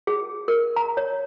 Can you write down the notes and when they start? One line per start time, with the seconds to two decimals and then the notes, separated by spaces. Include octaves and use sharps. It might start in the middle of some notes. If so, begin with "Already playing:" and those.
0.07 G#4
0.48 A#4
0.76 A#5
0.97 C#5